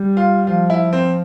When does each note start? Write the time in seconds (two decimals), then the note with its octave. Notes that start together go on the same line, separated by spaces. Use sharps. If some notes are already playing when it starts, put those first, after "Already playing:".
Already playing: G3
0.17 F4
0.47 F3 F4
0.70 E4
0.93 C4